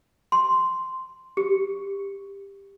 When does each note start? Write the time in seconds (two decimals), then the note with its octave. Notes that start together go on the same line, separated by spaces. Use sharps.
0.32 C6
1.37 G4